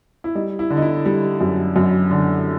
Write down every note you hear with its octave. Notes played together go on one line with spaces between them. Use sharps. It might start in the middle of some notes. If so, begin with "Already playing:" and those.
E4
G3 D#4
E4
D3
D#4
E4
G3
F#2
F#2
D3